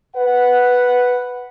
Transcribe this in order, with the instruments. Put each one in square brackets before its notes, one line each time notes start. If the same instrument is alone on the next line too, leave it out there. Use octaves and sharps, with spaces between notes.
[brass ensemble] B4 F#5